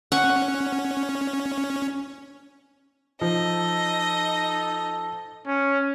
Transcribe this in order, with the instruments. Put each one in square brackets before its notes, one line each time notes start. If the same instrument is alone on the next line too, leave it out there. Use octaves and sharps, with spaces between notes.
[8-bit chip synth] C#4 [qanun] F#5 C#6
[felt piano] F3 [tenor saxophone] D#4 [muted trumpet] A4 [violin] D#5
[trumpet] C#4